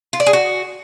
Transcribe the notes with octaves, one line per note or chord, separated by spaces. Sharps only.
F4
D5
G#4
F#4